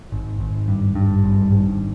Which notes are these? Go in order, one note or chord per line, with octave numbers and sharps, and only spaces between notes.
G#1
G#1
G2
G2
G#1
G#1